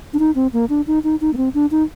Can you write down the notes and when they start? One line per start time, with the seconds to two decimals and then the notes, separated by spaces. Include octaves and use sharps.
0.13 D4
0.19 D#4
0.35 C4
0.53 A#3
0.69 D4
0.87 D#4
1.04 D#4
1.21 D#4
1.34 A#3
1.37 C4
1.54 D4
1.71 D#4